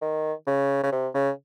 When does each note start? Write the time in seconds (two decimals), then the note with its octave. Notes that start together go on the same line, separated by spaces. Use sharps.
0.02 D#3
0.47 C#3
0.83 C#3
0.92 C3
1.14 C#3